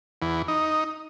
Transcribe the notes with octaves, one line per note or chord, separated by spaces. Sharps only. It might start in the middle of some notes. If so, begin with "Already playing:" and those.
E2
D#4